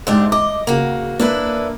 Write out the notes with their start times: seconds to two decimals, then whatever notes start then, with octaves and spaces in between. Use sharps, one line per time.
0.07 G#2 A3 D4 G4
0.32 D#5 D6
0.67 C#3 A#3 F#4
1.20 A#3 D4 E4 B4